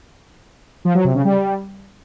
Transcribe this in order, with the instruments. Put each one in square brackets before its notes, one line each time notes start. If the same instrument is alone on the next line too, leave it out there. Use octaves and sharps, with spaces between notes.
[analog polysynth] F3
F#3
C3
C#3
G3